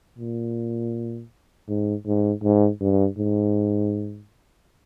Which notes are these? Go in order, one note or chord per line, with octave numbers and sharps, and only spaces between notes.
A#2
G#2
G#2
G#2
G2
G#2